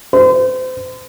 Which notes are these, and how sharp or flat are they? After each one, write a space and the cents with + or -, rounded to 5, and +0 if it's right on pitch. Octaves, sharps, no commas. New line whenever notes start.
C5 -35